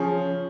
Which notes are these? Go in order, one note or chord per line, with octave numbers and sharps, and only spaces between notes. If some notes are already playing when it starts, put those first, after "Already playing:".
Already playing: C#3 F3 C#4 G#4 C#5